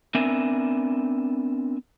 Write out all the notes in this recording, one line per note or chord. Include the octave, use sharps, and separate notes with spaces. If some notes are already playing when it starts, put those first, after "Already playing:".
B3 C4 D4 A#4 E5 G#5